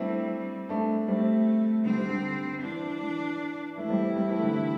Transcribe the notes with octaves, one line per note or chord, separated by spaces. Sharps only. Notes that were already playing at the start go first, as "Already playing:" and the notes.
Already playing: G3 A3 C4 D4 E4
A3 D4
G3 A3 C4
D3 G3 C4
D3 G3
D3 G3
E3 D4
E3
E3 A3 E4
G3 C4
G3 C4
E3 A3
D3 G3
E3